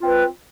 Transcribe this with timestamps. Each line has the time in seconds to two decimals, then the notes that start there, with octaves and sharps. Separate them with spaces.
0.01 F4
0.03 C4
0.06 B4